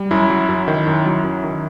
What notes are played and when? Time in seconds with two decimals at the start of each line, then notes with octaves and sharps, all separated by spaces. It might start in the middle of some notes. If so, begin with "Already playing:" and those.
Already playing: G3
0.11 F#2 E4
0.30 F#3
0.49 F#2
0.68 D#3
0.87 F#2
1.06 F#3
1.25 F#2
1.44 D#3